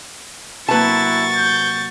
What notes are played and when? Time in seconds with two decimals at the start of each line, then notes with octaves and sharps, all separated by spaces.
0.68 C3 F#3 A#3 E4 B4 A5 C#6 A6
1.36 G6